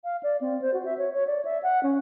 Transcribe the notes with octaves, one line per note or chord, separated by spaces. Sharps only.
F5
D5
C4
C5
F#4
E5
C#5
C#5
D5
E5
F#5
C#4